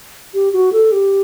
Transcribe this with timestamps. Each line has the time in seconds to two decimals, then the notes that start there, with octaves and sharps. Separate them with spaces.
0.34 G4
0.53 F#4
0.73 A4
0.92 G4